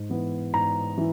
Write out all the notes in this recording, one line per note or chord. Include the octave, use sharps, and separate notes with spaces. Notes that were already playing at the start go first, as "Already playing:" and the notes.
Already playing: G#2
E3 B3
G#2 A#5
E3